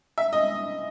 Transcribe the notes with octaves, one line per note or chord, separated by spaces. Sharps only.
E5
D#5